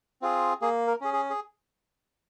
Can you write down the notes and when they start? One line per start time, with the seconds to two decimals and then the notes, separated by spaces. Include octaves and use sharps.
0.22 C4 F4 G#4
0.61 A#3 G#4
0.87 A#4
1.01 C#4 G#4
1.13 G#4
1.30 G#4